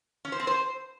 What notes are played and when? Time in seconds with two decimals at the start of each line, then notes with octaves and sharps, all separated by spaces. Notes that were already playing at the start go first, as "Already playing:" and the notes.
0.25 C#4
0.32 C5
0.40 C4
0.47 C5